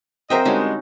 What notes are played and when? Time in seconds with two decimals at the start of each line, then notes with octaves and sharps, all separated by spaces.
0.30 F#3 C4 G#4 A#4 C5 D#5 E5 G5
0.45 D3 G3 G#3 C#4 D#4 F#4